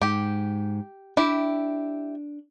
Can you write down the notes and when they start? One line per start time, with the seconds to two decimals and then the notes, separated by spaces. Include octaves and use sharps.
0.02 G#2 G4 G5
1.17 D4 E4 G4 E5